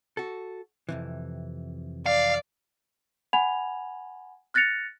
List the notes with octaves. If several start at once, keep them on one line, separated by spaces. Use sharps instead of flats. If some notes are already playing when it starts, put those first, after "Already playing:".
F#4 A4
F2 C3 E3
D5 F5
F#5 G#5 B5 G#6 F7
F6 F#6 A6 A#6 C#7 F7